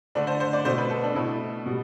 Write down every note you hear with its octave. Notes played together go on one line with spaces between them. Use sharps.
D3 A3 D4
C5
C5
D5
B2 A3 C5
B4
A4
D4
B2 A3 E4
B2 G3